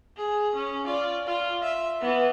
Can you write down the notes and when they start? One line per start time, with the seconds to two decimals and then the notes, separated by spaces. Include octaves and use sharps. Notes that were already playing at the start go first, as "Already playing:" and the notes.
0.17 G#4
0.56 C#4
0.86 F4 D5
1.27 F4
1.62 E5
2.01 E3 B3